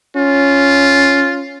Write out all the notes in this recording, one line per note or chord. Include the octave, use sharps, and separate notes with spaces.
C#4 F4